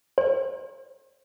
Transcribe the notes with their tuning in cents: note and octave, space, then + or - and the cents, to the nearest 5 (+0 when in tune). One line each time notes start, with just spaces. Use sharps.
C5 +40